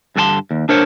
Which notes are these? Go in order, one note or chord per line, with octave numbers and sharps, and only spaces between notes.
G2 D3 F4 F#4 A5 C6
D#2
D4 A#4 C5 C#5